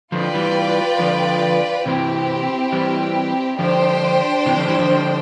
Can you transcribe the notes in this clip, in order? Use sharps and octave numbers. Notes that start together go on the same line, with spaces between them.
D3 F3 F4 B4 D5 G5
E3 G3
D3 F3
C3 E3 C4 E4 G4
E3 G3
D3 F3 D4 G4 C5 G5
C3 E3
D3 F3
E3 G3
D3 F3
D3 F3